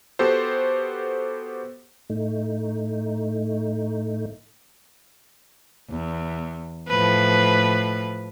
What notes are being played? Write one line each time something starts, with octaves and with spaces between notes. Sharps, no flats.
B3 F#4 G4 A4 C5
A2 A3 D#4
E2
A2 F3 B4